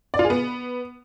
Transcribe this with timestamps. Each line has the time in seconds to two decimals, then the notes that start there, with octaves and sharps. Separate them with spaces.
0.14 D5
0.19 F4
0.25 G#4
0.30 B3